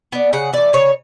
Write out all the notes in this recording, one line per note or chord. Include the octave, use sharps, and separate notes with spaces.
B3 D4
C#3 F#5
E3 A3 D5
C#3 C#5